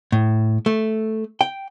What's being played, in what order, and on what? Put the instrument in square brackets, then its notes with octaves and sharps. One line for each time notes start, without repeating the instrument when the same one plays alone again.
[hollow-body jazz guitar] A2
A3
G5